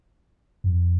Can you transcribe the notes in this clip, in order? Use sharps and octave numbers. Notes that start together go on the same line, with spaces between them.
F#2
F2